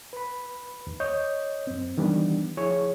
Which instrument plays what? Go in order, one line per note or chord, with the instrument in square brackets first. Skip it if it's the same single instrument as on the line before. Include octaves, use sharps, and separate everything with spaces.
[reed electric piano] B4 B5
D#2
C#5 D#5 G6
F#2 C4
D#3 E3 G3 B3 D4
F3 E4 G#4 C#5